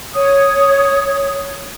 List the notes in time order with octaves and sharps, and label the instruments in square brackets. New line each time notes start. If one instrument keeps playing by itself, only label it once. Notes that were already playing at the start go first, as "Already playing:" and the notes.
[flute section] C#5 D#6